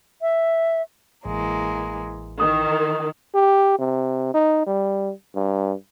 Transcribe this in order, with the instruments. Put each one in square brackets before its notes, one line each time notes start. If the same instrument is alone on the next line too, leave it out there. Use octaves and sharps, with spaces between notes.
[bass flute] E5
[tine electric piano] A1 [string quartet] E3 G#3 A#3
[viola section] D#3 [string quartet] E3 [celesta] D#6
[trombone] G4
C3
D#4
G3
G2